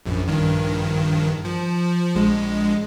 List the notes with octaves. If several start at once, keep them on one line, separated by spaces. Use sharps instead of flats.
A#1 F#2
A#1 G2 D#3
F3
A#1 G#3